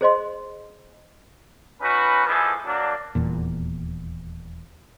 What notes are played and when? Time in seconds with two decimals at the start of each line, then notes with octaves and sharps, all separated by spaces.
0.01 G#4 C5 D#5 C6
1.81 C#4 D#4 F#4 B4
2.25 E3 F3 G#3 A4 B4
2.65 F#3 A#3 D4
3.15 D#1 E2 A#2